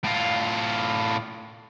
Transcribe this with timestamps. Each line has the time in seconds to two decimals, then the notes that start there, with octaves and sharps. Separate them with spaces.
0.04 A2 F4